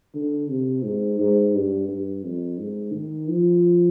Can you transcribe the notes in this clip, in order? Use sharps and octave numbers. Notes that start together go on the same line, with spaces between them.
D3
C3
G#2
G#2
G2
G2
F2
G#2
D#3
F3